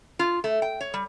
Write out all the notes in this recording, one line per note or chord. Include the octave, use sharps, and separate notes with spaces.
F4
A3
G5
C#5
G3